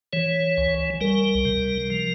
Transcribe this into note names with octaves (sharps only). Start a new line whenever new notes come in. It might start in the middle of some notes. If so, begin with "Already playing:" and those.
E3 C#5
C#2
G3 A#4
C3
F3